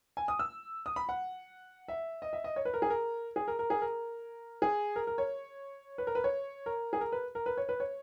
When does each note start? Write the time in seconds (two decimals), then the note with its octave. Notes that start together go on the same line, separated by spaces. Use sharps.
0.17 G#5
0.28 D#6
0.39 E6
0.86 D#6
0.96 B5
1.09 F#5
1.88 E5
2.22 D#5
2.33 E5
2.44 D#5
2.56 C#5
2.65 B4
2.74 A#4
2.82 G#4
2.90 A#4
3.36 G#4
3.48 A#4
3.59 A#4
3.70 G#4
3.82 A#4
4.62 G#4
4.96 A#4
5.07 A#4
5.18 C#5
5.98 B4
6.07 A#4
6.15 B4
6.24 C#5
6.66 A#4
6.93 G#4
7.01 A#4
7.12 B4
7.35 A#4
7.46 B4
7.57 C#5
7.69 B4
7.80 C#5